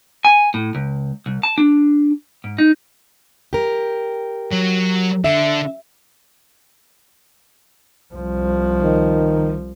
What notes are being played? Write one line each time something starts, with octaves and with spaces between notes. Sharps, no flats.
G#5
A2
C#2
C2
A5
D4
G#2
D#4
G4 A#4
F#3 C#5
D3 E5
C2 F3
D#3